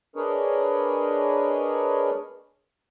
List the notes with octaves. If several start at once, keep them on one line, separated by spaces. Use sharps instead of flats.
D4 G#4 A#4 B4 C#5 D#5